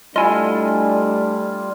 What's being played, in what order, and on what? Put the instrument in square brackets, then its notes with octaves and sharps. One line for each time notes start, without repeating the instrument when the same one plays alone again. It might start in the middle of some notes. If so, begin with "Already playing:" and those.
[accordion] G3 [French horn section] A3 D4 [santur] E4 F4 [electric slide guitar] D#5 G#5